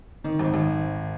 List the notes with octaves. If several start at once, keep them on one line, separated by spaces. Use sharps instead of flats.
D#3
G#1
G#1